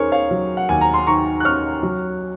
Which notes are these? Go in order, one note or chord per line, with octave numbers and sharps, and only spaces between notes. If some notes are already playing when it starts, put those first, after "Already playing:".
Already playing: D#2 D#3 C#4 G#4 A#4 C5 C#5
C#5 F5
F#3
F#5
D#2 G#5
A#5
C6
D#3 A#5 C#6
F#6
C#4 C#6 F6
F#3